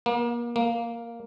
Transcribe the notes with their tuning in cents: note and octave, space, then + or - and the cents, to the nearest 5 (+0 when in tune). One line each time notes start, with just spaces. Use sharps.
A#3 +35
A#3 +0